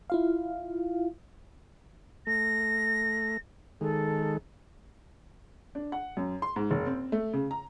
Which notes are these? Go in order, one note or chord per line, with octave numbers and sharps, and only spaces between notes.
E4 F4 F5
A3 A#6
D#3 G#3 A4
D4
F#5
F#2
C6
G#2
F#1
C4
A3
C#3
A#5